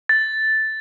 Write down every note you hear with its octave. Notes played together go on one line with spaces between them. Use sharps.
A6